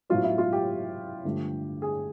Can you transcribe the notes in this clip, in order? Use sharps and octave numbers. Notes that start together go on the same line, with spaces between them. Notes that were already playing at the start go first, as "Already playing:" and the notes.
A2 F#3 B3 F4
E4
F4
G4
G2 D3 F3 A3
G#4